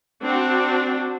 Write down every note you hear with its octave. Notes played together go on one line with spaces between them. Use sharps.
C4 D4 F#4